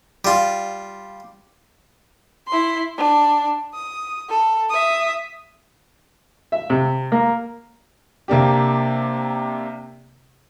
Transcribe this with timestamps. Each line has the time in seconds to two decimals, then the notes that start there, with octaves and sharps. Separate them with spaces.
0.25 G3 F4
2.48 E4 C6
2.98 D4
3.74 D#6
4.29 A4
4.69 E5 D#6
6.52 E5
6.70 C3
7.12 A#3
8.28 C3 A#3 D4 G4